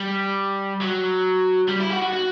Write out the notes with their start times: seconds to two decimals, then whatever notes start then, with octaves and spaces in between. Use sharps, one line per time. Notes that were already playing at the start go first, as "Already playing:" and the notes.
Already playing: G3
0.81 F#3
1.69 G3
1.80 E4
1.90 F#4
2.02 F#4
2.12 F#4